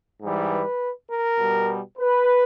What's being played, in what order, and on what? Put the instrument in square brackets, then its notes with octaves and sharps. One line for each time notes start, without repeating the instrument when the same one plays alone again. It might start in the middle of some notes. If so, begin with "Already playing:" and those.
[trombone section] G#2 E3 G3
B4
A#4
B2 G3
B4